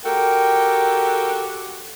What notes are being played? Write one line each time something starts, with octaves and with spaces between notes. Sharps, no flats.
F#4 G4 A4 A#4 G5